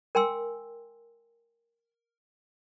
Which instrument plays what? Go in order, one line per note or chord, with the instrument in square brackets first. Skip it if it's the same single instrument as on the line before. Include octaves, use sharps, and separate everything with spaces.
[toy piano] A#4 G5 G#5 C6 E6